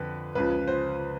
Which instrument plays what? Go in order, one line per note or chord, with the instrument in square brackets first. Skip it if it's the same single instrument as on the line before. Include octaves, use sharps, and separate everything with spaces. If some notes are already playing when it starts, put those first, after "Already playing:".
Already playing: [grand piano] F2 D3 B4
C#2 C#3 F3 B4
C5